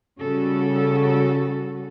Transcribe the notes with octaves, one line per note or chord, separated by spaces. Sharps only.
C#3 G3 C#4 F#4 A4